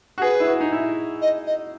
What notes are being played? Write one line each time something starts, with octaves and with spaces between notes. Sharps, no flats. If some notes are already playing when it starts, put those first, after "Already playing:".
F#4
G#4 B4
E4
F#4
D#4
E4
D#5
D#5